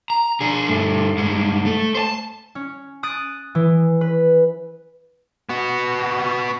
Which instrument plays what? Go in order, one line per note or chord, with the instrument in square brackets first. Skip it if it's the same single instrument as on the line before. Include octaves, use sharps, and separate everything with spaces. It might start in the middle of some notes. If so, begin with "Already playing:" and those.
[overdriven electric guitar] A#5
D4 G#4
G2 A3
G2 G#3
A3
C5 A5
[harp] C#4
D#6 F#6 A6 D7
E3
B4
[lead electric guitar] B3 F#4